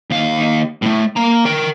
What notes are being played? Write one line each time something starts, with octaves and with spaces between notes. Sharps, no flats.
D#2 F5
A2 A3
A#3 A#5
A#4 G5